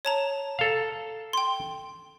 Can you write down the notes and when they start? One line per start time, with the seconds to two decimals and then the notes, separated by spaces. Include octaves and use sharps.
0.05 C#5 A5 A#5
0.59 A4 F5
1.33 G5 C6